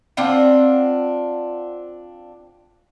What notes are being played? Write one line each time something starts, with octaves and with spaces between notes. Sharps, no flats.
C4 D4 F4 F#5